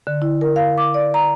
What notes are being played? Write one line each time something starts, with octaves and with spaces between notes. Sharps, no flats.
D3
E4
A#4
F5
D6
D5
A#5